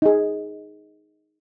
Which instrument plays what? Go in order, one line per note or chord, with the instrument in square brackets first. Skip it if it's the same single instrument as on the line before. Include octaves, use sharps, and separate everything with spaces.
[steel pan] D#4 G#4